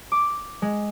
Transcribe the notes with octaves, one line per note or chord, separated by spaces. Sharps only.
D6
G#3